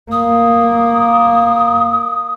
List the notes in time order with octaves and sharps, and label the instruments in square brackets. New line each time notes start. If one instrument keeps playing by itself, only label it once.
[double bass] A#3 [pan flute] D#6